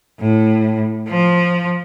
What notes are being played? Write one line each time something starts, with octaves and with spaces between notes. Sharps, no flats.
A2
F3